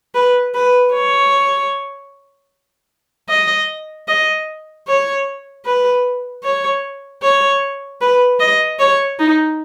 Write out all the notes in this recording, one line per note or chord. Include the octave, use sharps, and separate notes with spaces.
B4
B4
C#5
D#5
D#5
C#5
B4
C#5
C#5
B4
D#5
C#5
D#4